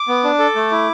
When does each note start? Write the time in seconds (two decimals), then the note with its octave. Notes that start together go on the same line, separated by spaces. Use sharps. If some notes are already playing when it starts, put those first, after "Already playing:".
Already playing: D6
0.08 B3
0.24 D4
0.39 A4
0.56 A3
0.71 E4